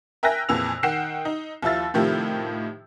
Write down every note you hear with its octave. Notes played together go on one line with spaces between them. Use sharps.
A#4 E5 G5 G#5 F#6 A#6
F2 A#2 E3 G#4 E6 F7
D#3 F#5 G5 C7 E7
D#4
D#2 F3 E4 F5 E6 A6
A2 C3 D#3 F3 A3 G4